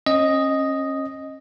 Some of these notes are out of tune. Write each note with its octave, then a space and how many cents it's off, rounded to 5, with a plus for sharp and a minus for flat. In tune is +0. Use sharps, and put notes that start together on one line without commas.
C#4 -35 D#5 +0